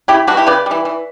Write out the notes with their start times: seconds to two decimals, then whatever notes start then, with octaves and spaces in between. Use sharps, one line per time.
0.08 C#3 E4 G4
0.27 E3 G3 D4 F#4
0.37 E4 G4
0.46 C#3 B4 D5
0.66 E3 G3
0.85 E3